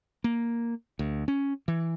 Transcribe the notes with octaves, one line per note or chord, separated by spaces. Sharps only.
A#3
D2
C#4
E3